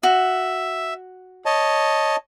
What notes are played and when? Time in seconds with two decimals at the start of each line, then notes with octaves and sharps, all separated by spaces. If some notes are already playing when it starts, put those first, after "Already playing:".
0.03 F#4 E5
1.46 C#5 D#5 A5